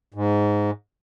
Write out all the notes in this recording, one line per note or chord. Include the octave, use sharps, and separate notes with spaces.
G#2